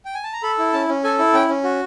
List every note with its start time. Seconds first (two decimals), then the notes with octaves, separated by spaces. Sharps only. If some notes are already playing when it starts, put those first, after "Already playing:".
0.05 G5
0.15 G#5
0.24 A5
0.33 A#5
0.43 A4 B5
0.58 E4
0.73 C#4 A5
0.88 C#4
1.04 A4 G#5
1.19 E4
1.33 C#4 G5
1.49 C#4
1.63 F#4